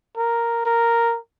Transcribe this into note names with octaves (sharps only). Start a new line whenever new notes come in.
A#4
A#4